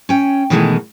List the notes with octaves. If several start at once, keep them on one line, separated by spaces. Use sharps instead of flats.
C#4 G5
B2 D#3 E3 G#3 A3